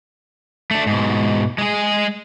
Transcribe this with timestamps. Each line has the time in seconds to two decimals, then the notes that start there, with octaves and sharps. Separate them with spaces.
0.71 A3 D4
0.87 G#2 B2
1.58 G#3 G#4